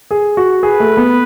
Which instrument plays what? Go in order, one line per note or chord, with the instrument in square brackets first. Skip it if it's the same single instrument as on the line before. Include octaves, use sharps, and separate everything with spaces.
[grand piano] G#4
F#4
[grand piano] G#4 [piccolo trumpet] B4
[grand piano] A3
B3